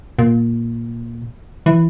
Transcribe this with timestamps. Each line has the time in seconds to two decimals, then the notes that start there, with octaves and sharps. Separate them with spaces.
0.19 A#2
1.66 E3